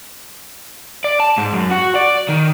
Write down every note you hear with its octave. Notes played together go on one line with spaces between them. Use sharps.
D5
A5
G#2
F#2
F#4
D5
D#3